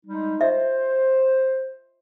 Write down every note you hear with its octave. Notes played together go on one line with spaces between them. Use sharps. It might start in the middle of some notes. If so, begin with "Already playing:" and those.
G3 G#3 D#4
F4 C5 D#5 E5